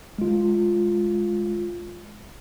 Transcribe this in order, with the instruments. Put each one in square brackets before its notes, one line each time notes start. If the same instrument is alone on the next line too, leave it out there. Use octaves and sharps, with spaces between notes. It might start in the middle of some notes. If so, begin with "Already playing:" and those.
[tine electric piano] G#3 F4